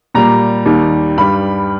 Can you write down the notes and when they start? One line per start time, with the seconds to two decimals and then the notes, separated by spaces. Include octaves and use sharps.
0.14 A#2 G3 A#5
0.66 D#2 D#3 G3
1.18 G2 G3 B5